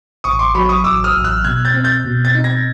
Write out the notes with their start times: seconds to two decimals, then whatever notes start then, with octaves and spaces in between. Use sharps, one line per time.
0.24 A1 C#6 D#6
0.39 C6 D6
0.54 F#3 B5 C#6
0.69 C#6 D#6
0.84 A1 D6 E6
1.04 D#6 F6
1.14 A1
1.24 E6 F#6
1.44 B2 F#6 G#6
1.65 G6 A6
1.74 C4
1.84 G6 A6
2.04 B2
2.25 G6 A6
2.35 D#4
2.44 G#6 A#6